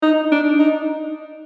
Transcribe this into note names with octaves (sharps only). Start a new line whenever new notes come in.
D#4
D4
D#4